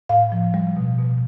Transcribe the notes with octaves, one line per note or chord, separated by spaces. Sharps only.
A2 F5
F3
G3
B2
B2